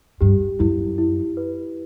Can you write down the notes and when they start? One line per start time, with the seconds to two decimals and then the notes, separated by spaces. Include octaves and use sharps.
0.21 G2 G4
0.59 F#2 E4
0.98 E4
1.37 B4